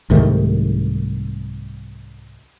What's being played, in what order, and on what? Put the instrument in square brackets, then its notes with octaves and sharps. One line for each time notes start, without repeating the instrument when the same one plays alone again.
[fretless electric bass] C2 G#2 D#3 A3